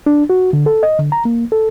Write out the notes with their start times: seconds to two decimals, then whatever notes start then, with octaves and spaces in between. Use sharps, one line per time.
0.06 D4
0.30 F#4
0.53 D3
0.66 A4
0.83 D#5
0.99 D3
1.12 A#5
1.25 A#3
1.52 A4